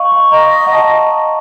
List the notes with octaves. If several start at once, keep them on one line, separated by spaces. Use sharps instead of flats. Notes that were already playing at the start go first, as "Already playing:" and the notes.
Already playing: D#5 F5 C#6
C6
D#5 A#5
F#5
A5